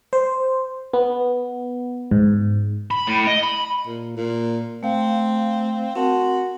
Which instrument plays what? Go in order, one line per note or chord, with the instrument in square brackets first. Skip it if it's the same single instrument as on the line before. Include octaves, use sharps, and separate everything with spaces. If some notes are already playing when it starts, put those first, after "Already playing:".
[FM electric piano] C5
B3
G#2
[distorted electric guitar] B5
A2
D#5
B5
[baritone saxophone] A#2
A#2
[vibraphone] A3 F5 [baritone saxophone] C4
[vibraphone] C4 A#4 A5 [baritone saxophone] F#4